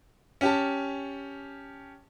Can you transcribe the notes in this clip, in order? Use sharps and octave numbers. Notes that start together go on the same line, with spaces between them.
C#4 G4 A5